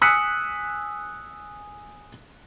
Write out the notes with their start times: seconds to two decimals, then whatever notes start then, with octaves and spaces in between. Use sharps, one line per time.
0.01 G#5 D#6 E6 F#6 B6 C#7